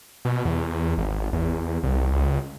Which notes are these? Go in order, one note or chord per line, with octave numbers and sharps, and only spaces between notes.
B2
E2
G#1
E2
C2
C#2